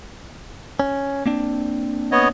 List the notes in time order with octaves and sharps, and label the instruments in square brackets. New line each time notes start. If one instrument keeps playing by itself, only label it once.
[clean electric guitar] C#4
A#3 C4 D4
[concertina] B3 C#5 D#5